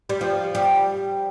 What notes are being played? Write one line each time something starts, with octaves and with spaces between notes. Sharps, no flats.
G3
F3
G3